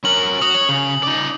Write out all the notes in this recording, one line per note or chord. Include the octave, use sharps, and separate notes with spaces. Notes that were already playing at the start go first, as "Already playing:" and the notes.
C#4 A#4 F#7
F#4 D#6
C#5
C#3
D#4 D5